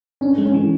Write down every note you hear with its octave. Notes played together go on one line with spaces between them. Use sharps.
C#4 D4
G#3
C#4
E3